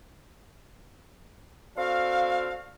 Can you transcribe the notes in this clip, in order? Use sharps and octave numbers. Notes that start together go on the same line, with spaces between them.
C4 D4 F#4 A4 F5